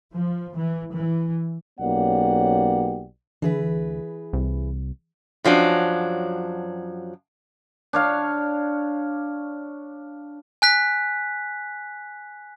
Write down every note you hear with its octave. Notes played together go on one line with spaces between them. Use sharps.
F3
E3
E3
B1 A#3 C#4 G4 D5 F#5
D2 E3 G#4 B4
C2
F#2 F3 F#3 D4
D4 C#5 F5
G#5 F#6 B6